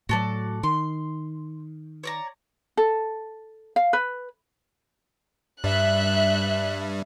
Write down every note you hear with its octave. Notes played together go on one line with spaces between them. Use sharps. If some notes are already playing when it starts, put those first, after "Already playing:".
A2 F#3 F#4 A4 D5
D#3 C6
C#5 D5 A#5
A4
F5
B4
G2 G3 E5 F#6